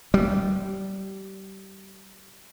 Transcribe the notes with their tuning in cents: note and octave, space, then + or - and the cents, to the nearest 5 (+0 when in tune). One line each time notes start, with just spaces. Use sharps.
G3 -25